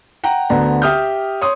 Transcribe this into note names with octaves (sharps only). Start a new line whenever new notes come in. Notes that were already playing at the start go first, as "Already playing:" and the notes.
F#5 G5 A#5
D2 D3 B3 A#5
G4 E5 D#6 F6 G6
C#5 C6 D#6